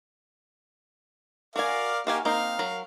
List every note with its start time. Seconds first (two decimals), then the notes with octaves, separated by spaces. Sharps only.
1.56 F#4 A#4 D5 F5 G#5
2.07 A#3 D#4 F#4 G4 F5 G#5
2.25 A#3 C4 D#4 F5
2.59 F#3 A#4